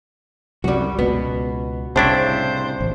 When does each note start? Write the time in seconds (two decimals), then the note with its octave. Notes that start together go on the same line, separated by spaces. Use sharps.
0.64 C2 F#2 G3 F#4
0.99 C#2 B2 B3
1.96 C2 A2 C#3 D4 E4 C5
2.81 A1